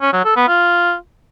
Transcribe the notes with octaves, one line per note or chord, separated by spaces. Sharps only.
C#4
F#3
A4
B3
F4